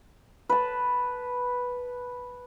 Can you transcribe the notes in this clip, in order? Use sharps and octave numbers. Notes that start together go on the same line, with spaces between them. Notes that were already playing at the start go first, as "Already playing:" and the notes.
B4 A5